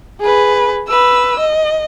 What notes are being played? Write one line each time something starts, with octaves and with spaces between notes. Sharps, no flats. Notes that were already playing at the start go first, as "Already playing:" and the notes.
G#4 B4
B4 E6
D#5